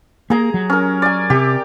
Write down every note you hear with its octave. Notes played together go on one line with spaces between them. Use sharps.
A#3 G#4 A#5
F#3
C#4 A#4
D5 G#5
C3 G4